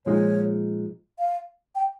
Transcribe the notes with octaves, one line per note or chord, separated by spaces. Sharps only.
A#2 F3 G#3 D#4 C#5
F5
G5